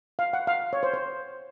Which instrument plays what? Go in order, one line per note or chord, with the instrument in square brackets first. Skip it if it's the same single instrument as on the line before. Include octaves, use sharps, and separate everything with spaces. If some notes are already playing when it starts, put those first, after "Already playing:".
[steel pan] F5
F#5
F5
C#5
C5
C5